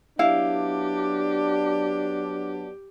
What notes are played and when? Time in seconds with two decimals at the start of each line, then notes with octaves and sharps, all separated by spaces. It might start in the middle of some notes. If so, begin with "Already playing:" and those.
0.19 F#3 B3 D4 E4 G4 F5